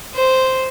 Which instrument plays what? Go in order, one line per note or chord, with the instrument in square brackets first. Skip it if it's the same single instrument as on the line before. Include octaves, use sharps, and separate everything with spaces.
[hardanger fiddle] C5